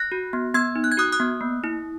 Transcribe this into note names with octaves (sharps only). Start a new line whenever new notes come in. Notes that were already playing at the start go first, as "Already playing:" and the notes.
Already playing: F#6 A#6
F#4
B3
B3 E6 G#6
D#4
F#6
G#6
F#4 D#6 F#6
D#6 F#6
B3
A#3
E4